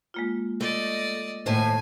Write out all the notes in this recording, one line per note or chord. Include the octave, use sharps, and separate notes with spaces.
G#3 A#3 F4
A3 D5 D#5
D#2 A2 C5 G#5 A5